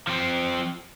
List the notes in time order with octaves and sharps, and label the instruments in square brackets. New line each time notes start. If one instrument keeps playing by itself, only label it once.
[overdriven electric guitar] F3 C4